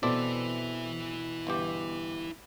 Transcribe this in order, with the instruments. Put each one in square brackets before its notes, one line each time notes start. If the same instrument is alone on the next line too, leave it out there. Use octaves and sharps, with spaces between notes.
[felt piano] B2 [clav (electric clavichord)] C4 A4 D5 [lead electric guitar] E4 B4
[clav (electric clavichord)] G1 E3 G4